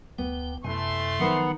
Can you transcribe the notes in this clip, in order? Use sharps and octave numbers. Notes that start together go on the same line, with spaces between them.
D2 B3 G5
F#2 C3 A3 E4 G#5 C6
D#3 F3 F#3 B3 D#4 C5